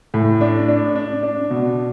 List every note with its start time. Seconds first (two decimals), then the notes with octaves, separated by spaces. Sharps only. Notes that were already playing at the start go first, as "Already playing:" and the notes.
0.14 A2
0.41 D4
0.68 D4
0.95 D4
1.23 D4
1.50 B2